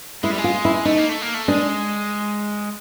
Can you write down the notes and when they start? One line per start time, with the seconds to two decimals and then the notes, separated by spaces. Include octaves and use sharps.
0.23 G#3 E4
0.31 G3
0.38 G#3
0.44 F4
0.65 E4
0.85 A3 D#4
0.98 A#3
1.09 A3
1.22 A#3
1.34 A3
1.48 G#3 D4